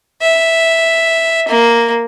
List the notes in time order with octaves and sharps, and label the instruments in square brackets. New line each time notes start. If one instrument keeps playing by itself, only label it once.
[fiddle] E5
A#3